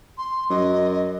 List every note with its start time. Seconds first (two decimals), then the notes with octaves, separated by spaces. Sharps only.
0.18 C6
0.50 F#2 D#5